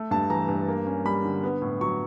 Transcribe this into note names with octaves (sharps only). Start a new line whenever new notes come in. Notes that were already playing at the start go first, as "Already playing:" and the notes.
Already playing: A3
G2 A5
E3 A#5
G2
A#3
C#4
G3 B5
D3
B3
A2
F#3 C#6